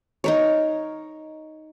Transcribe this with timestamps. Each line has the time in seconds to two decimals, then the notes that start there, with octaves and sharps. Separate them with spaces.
0.24 D#4 A#4 C#5